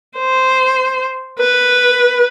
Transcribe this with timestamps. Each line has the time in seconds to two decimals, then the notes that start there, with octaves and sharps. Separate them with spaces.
0.18 C5
1.38 B4